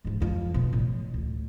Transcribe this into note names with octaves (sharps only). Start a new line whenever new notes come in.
G#2 F3
F2 F3
B2 F#3
A1
D2